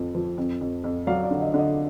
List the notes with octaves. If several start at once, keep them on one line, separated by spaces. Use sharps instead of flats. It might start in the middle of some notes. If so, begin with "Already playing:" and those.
Already playing: F2 F3
F3
F2
F2
F2
F#3 D5 F5
D5 F5
D3
D#5
D3
D#5